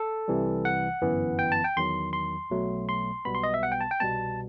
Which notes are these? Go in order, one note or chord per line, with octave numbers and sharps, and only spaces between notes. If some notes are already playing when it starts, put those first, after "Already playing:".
Already playing: A4
C2 C3 E3 G3
F#5
G1 F#2 E3 B3
G5
A5
G5
E2 D#3 F#3 C6
C6
B1 B2 F#3 A3
C6
B1 B2 G3 B3 B5
C6
D#5
E5
F#5
G5
A5
G5
C2 B2 G3 B3 A5